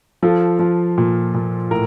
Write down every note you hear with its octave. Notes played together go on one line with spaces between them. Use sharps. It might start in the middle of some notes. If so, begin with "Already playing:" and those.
F3 F4 A4
F3
A#2
A#2
A2 A#4